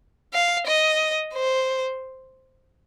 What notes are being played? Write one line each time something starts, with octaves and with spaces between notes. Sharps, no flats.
F5
D#5
C5